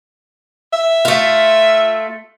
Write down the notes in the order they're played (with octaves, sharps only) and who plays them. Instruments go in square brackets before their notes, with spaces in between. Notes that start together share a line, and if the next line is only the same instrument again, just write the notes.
[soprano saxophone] E5
[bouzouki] A3 F4